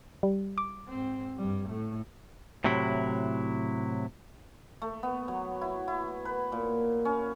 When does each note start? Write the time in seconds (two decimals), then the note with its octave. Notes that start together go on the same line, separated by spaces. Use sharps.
0.23 G3
0.58 D6
0.88 G#2 C4
1.37 G2 G3
1.69 A2 A3
2.64 A2 C3 F#3 E4
4.82 A3
5.03 B3
5.28 F#3
5.61 E4
5.88 E4
6.25 B4
6.52 A#2
7.05 C#4